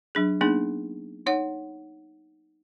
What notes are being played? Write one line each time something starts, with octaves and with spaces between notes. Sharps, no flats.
F#3 D4 G#4
A#3 B3 D4 D#4 G#4
D#4 C#5 F#5